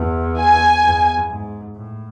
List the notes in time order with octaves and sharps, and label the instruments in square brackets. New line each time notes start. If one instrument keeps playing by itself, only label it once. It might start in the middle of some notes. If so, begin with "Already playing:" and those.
Already playing: [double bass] E2
[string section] G#5
[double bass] E2
G#2
A2